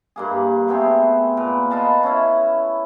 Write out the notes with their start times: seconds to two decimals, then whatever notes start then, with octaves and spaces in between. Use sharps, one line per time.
0.16 G2 A#3 G#4
0.68 A3 B3 C4 G#4
1.37 A#2 A#4 B4
1.71 F4 D#5 A5 B5
2.03 C#4 E4